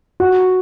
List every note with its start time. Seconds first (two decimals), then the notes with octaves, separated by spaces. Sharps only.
0.20 F#4